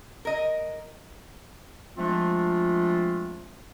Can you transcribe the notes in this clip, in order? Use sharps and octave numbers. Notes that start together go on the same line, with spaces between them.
A#4 D#5
F3 G#3 A3 C4 D4 F4